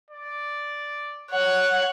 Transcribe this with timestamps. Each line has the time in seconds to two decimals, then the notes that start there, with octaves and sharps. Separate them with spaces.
0.11 D5
1.31 C#5 F#5 F#6